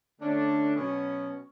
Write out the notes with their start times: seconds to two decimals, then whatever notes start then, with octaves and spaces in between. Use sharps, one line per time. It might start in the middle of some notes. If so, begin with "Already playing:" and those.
0.19 D3 A3 C#4 D4
0.75 B2 F#3 B3 C#4